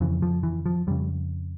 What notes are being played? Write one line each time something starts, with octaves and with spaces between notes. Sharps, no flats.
F2 C#3 E3
F3
E3
F3
F2 C#3 G3